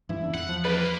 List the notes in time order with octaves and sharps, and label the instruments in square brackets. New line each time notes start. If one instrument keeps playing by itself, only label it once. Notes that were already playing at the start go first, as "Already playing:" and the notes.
[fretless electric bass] G2 E3 [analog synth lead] E4
[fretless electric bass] F#1 D4
[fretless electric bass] E2 [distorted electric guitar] F#5
[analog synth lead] F3
[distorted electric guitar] G3 A#3 [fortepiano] B4
[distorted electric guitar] A#3